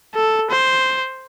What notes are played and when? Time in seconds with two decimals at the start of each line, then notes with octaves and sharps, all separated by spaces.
0.15 A4
0.50 C5